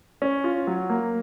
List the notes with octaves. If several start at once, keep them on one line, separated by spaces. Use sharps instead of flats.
C#4
F4
F#3
A#3